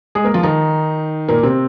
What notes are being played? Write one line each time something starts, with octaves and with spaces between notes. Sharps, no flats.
G#3 G#4
A#3 A#4
F3 F4
D#3 D#4
A#2 A#3
C3 C4